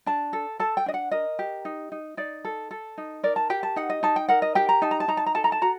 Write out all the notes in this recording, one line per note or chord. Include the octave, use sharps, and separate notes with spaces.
D4 A5
A4
A4 A5
G5
D4 D#5
F#5
A#4 D#5
G4
D#4
D#4
D#4 D5
A4
A4
D#4
A#4 D5
A5
G4 G5
A5
D#4 F#5
D#5
D#4 A5
G5
A#4 F#5
D#5
G4 G5
A#5
D#4 A5
A#5
A5
D#4 A#5
A5
A#5
A4 A5
A#5
A5
F#4 A#5